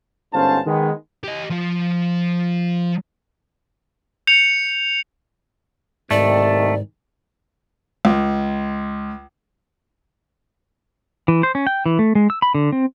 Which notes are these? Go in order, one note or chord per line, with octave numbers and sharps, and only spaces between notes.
G1 G#2 C#4 C5 F5 A5
D#3 G#3 B3
G4 D#5
F3 F4
G6 C#7 F7
C2 G#2 C3 D#3 A3 D5
C#2
E3
C5
C#4
G5
E3
A3
G#3
E6
B5
D3
C4